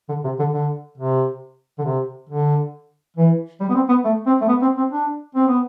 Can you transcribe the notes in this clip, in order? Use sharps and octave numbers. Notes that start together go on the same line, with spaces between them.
D3
C3
D3
D3
C3
D3
C3
D3
E3
G3
B3
C4
B3
A3
C4
A3
B3
C4
C4
D4
C4
B3